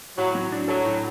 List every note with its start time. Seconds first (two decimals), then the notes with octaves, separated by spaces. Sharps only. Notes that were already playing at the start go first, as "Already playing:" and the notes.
0.18 A2 F#3
0.35 F#3
0.52 D4
0.68 F#3 A4
0.85 A2